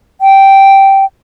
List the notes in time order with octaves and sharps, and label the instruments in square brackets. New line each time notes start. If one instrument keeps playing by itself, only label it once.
[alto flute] G5